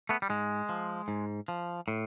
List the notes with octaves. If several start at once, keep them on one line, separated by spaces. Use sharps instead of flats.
A3 B3
G3
G#2 G#3
F3
G#2
F3
A2